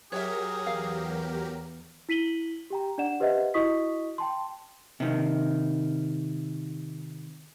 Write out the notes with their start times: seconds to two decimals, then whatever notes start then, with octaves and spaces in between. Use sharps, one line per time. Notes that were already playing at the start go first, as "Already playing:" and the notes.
0.12 F#3 G4 G#4 A#4 C#5 E5
0.67 E2 F5
2.09 E4 B6 D#7 F#7 G7
2.70 G4 G5 A#5
2.98 D4 D5 F#5 E7
3.20 G4 B4 C5 D#5 E5 F#5
3.54 E4 F#4 D#5 C#6 D#6 B6
4.18 G5 A5 C6
5.00 C3 D#3